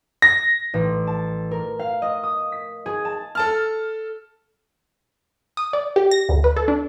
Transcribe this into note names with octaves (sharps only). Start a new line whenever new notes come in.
A#6
A1
A5
A#4
F5
D#5
D#6
B6
G#4
A5
A4 A5 F6
D#6
D5
G4
A#6
D2
B4
A4
D4